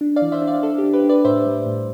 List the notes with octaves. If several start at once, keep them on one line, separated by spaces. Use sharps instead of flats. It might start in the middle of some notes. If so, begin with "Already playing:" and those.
D4
D5 F5
E3
C5 E5
D4
D5 F5
D4 A4
G4
D4
G4 B4
D4
B4 D5
A2 C5 E5
G3
A2